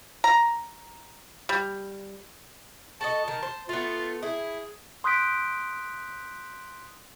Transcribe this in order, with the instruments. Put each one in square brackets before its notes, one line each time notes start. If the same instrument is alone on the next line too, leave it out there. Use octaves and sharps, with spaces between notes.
[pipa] A#5
G3
[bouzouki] F#4 A4 D#5 [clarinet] A5
[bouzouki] D#3
C5
[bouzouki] A3 B3 [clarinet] F4
[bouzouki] E4 [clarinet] G#4
[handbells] C6 D#6 F#6 G6 B6 D7